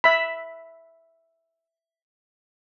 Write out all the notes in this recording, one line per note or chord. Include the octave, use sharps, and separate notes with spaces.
E5 B5